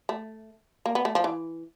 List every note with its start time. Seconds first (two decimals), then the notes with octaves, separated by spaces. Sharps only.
0.09 A3
0.86 A#3
0.95 B3
1.05 A3
1.15 F3
1.24 E3